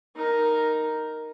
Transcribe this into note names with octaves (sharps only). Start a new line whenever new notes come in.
D#4 A#4